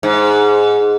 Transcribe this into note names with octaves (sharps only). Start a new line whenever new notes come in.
G#2